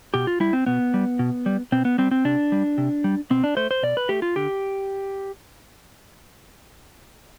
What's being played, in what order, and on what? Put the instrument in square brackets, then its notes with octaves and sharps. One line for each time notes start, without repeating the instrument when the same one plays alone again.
[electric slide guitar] B2 G4
F4
G3 E4
C4
B2 B3
G3
B2
G3
B2 C4
B3
G3 C4
C4
C3 D4
G3
C3
G3
B2 C4
D4
A3 C5
C5
B2 D5
B4
A3 G4
F4
D3 G4